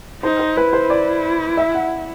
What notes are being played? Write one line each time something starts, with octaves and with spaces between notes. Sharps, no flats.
D#4 C5
C5
E4 B4
C5
D5
E5
F#5